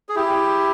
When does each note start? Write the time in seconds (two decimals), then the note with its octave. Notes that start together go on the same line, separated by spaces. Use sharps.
0.09 G#4
0.15 E4 G4